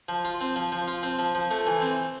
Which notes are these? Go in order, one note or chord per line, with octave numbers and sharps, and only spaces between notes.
F3
F4
C4
F3
F3
F4
C4
F3
F3
A3
E3
C4